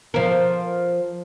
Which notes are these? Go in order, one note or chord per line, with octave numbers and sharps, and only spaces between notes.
F3 A#4